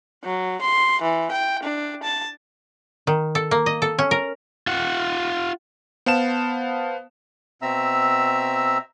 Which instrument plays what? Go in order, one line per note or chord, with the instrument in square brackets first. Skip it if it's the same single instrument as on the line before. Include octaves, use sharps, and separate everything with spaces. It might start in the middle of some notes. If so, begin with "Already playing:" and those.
[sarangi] F#3
C6
E3
G5
D4
A5
[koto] D#3
A4
A#3
D#5
A4
C#4
A#4
[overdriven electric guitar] F4 F#5
[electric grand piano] B3 C5 F5 A5 E7
[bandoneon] B2 C4 E5 A#5 E6